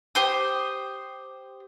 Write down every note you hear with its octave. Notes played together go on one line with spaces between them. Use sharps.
G4 C5 D#6